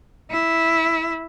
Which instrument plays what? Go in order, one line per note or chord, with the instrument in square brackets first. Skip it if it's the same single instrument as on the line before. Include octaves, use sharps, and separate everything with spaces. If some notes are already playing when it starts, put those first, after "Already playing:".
[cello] E4